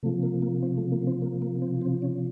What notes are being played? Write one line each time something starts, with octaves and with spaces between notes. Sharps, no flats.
C3 F3 A3
A#3
A#3
C4
A3
A#3
C4
A#3
A#3
C4
C4
C#4